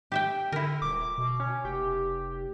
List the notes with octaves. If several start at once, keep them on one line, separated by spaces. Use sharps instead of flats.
G4 E5 G5
D3 E4 A#4
D#1 D6
B2
C#4
F1 G4